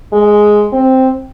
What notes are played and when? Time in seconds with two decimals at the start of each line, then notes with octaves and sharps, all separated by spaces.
0.13 G#3
0.73 C4